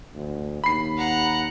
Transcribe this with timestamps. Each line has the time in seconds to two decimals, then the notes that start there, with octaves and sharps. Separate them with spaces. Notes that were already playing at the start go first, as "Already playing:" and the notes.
0.15 D2
0.64 D#2 B5 C7
0.97 F#5 A#5